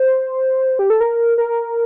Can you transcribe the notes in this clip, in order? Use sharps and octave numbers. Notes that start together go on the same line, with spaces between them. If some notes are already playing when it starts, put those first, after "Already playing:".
Already playing: C5
G4
A4
A#4
A#4